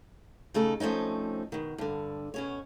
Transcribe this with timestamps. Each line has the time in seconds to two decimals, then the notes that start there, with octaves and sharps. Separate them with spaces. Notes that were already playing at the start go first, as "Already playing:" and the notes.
0.54 C#3 A3 D#4 A4
0.80 F3 A3 C4 C#4 D#4
1.52 B2 D#3
1.78 G2 D3
2.34 B2 C#4 C#5